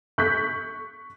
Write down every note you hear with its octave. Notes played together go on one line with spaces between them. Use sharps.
C#6 F#6 G6 B6